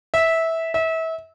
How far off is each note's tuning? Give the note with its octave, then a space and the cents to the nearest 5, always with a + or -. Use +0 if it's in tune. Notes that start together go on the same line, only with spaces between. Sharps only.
E5 -15
E5 -30